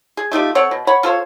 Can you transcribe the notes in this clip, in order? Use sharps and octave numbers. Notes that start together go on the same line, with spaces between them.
G#4
A3 D#4 F4 G4
C4 A4 C#5 F#5
B2
C#5 F#5 B5 C#6
F4 A4 C5 C#5